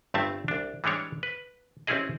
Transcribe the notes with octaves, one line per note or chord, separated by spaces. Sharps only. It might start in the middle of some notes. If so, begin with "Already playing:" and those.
G1 G2 A3 C4 E5 A5
C2 D4
E3 G3 G#3 D4 C#5
B4
A1 C4 C#4 E4 G#4 D#5